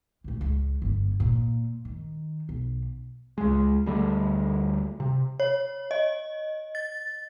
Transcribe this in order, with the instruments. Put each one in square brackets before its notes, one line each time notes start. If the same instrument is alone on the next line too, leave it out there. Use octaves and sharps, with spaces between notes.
[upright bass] D2 A2
C#2
G1 G#2
A#2
D#3
B1
[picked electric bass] C#2 G#3
D2 G3 A3
C3
[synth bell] C#5
D#5
A6